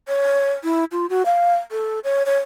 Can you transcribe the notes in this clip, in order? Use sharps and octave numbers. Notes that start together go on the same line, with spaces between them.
C#5
E4
F4
F#4
F5
A4
C#5
C#5